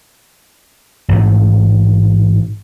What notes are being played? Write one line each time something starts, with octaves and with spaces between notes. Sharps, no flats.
A1 G#2 A3